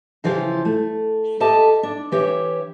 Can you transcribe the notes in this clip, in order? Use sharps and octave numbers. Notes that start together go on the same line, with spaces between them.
C#3 E3 F3 F4 G4
A3
G4 A4 D#5 E5 A5
D4
E3 G4 C#5 E5